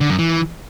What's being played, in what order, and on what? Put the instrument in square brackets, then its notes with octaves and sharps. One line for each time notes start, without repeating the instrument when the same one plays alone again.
[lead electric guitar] D3
F#2
E3